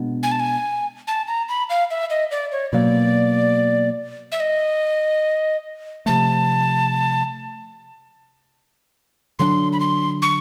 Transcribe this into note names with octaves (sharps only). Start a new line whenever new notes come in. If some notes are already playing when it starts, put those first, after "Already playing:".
Already playing: B2 G#3 B3 D4
G#5
A5
G#5
A5
A#5
B5
F5
E5
D#5
D5
C#5
B2 F#3 A#3 D5
E5
D#5
C3 F3 A3 A5
D3 F#3 A#3 D4 C6
B5
C6
C#6